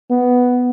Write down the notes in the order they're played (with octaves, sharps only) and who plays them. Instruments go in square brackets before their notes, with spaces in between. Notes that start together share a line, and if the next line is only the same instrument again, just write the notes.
[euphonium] B3